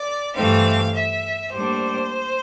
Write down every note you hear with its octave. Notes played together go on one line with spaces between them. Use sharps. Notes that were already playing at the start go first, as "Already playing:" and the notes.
Already playing: D5
G2 E3 A3 C4 F5
E5
A2 G3 A#3 D4 C5